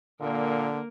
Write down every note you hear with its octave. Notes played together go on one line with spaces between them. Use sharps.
A#2 D3 A#3 A#4